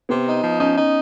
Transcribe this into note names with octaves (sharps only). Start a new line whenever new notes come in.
C3 B3
D#4
F3
C#4 D#4
D#4